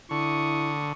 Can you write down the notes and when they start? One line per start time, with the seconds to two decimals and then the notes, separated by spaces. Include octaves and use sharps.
0.11 D3 E4 C#6 D#6